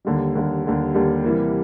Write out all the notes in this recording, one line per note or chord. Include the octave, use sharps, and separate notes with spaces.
D#2 D3 G3
D#2 D3 G3
D#2 D3 G3
D#2 D3 G3
C3 E3 G3 A#3